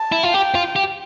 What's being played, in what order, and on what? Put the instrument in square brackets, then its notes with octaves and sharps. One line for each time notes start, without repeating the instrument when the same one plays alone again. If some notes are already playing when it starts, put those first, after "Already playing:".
Already playing: [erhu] A5
[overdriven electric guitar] E4
F4
[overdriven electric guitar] G4 [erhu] G5
[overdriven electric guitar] F4
G4